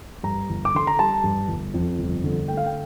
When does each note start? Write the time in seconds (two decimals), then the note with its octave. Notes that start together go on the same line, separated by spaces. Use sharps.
0.23 G2 A#5
0.49 G1
0.65 D6
0.74 D3 C6
0.87 A#5
0.99 G3 A5
1.24 G2
1.48 G1
1.74 F2
1.98 G1
2.24 D3
2.48 A3 G5
2.57 F5
2.66 G5